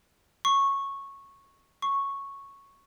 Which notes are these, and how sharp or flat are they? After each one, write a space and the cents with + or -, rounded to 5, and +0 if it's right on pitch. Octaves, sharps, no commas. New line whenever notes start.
C#6 -10
C#6 -5